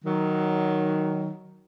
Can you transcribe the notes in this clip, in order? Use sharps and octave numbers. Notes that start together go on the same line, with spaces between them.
D#3 F#3